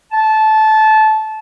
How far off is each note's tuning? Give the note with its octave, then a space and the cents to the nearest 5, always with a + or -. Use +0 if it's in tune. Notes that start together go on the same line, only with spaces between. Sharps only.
A5 -20